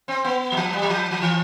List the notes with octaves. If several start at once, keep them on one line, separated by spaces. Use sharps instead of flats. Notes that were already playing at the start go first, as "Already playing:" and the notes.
C4
B3
F#3
F3
G3
F#3
F3
F3
E3